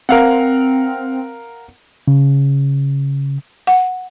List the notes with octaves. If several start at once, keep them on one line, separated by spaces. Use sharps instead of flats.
C4 A#4 F5 F#5
C#3
F#5